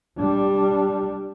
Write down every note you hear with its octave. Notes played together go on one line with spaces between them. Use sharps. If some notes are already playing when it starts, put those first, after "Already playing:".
G3 D4